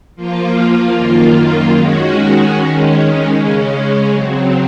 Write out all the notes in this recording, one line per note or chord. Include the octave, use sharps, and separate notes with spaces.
F3 A#3 F4
F#2 D#3 A#3 F4
D#3 G#3 C#4 F#4
D#3 G#3 C#4
C#3 G#3 C#4
C#3 F#3 C4